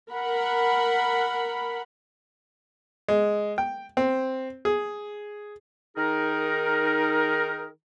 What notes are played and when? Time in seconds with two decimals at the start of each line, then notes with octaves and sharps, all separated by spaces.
0.12 A#4 F#5 B5
3.08 G#3
3.58 G5
3.97 C4
4.65 G#4
5.97 D#3 D#4 G#4 A#4